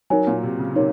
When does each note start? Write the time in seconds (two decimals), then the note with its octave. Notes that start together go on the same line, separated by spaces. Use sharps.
0.10 F#3 D#4 A#4 C#5 G#5
0.27 A#2
0.43 C3
0.59 C#3
0.76 C3 D#4 A#4 C#5